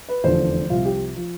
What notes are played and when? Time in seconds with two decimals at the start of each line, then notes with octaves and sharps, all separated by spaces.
0.09 B4
0.24 F1 E2 D3 F3 C5
0.70 C2 C3 F3 F4
0.85 G4
1.16 F3